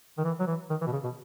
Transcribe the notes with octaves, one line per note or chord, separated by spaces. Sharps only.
D#3
E3
F#3
E3
D#3
E3
B2
C#3
B2